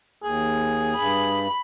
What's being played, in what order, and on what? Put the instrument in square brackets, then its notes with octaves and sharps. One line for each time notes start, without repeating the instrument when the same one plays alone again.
[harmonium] D#2 [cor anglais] G#4
[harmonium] G2 [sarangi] B5